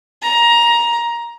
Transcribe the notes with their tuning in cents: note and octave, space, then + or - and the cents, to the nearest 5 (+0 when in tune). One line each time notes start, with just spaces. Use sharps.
A#5 +15